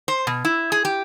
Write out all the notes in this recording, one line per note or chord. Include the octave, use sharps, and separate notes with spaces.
C5
B2
E4
G#4
G4